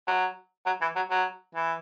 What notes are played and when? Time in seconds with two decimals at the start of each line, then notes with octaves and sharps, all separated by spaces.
0.08 F#3
0.66 F#3
0.81 E3
0.96 F#3
1.11 F#3
1.55 E3